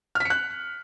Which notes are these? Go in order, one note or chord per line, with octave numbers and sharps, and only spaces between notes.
F6 F#6 B6 C#7